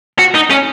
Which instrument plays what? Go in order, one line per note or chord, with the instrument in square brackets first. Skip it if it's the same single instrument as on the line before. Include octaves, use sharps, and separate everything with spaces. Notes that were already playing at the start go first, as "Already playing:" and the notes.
[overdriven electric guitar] F#4
D#4
C#4